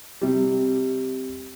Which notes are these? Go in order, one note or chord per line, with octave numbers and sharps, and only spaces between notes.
C3 G3